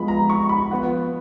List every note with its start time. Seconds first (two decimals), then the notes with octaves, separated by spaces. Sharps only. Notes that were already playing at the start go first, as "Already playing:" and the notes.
Already playing: F3 G#3 B3 B5
0.08 A#5
0.30 C#6
0.49 B5
0.71 F3 B3 F#5